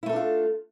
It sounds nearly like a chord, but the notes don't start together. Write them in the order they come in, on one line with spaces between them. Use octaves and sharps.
E4 A3 A4 D4 F4